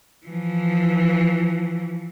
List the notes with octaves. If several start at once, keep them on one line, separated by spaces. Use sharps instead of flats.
E3 F3